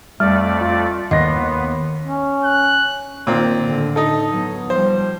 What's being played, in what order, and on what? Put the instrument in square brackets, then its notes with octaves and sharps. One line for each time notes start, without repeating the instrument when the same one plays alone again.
[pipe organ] F2 A3 D5 [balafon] G3
[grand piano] F4
[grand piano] D#2 C6 A#6 [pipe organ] B3 [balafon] D#5
[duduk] C#4
[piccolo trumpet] F#6
[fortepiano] A#2 C4 [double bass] D#3
[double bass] A2 D3
[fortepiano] D#4 A4
[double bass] F#3 B3
[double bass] F3 G3 [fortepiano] C5